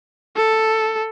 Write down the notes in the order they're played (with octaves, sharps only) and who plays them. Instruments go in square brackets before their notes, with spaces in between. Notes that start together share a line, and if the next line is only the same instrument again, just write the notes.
[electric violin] A4